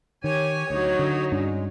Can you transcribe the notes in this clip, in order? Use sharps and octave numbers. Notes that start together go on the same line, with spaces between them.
D#3 G4 C#5 G#5
D2 F#3 D#4
D3
G2 G#3 C#4 D4